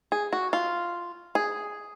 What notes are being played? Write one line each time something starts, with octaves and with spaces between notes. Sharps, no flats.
G#4
F#4
F4
G#4